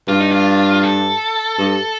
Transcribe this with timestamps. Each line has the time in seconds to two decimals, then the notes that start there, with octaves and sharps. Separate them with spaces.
0.08 G2 F4
0.20 D#4
0.32 F4
0.84 A4
1.58 G2